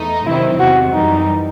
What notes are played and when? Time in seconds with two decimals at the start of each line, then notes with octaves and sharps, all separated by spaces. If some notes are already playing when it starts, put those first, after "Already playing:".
Already playing: E2 A3 D#4
0.26 C3 D#3 F#3 C4 E4
0.59 E2 C3 D#3 F#4
0.93 F#2 E3 G3 D#4